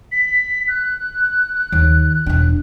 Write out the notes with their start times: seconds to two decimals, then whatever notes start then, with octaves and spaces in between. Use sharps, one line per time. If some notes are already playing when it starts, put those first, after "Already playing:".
0.12 B6
0.68 F#6
1.72 D#2
2.26 E1 D4